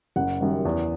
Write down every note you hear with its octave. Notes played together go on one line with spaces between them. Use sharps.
F#1 F#5
F#2 D#3 G3
E2